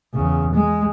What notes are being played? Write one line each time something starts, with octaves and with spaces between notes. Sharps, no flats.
E2 C#3
G#3